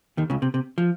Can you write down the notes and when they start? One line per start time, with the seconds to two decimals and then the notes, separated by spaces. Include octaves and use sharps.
0.17 D#2 D#3
0.30 C#2 C#3
0.42 C3
0.54 C3
0.78 F3